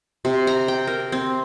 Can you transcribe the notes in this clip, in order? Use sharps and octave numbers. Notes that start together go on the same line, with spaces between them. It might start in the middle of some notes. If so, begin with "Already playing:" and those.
C3
A#5
G5
A#4
C4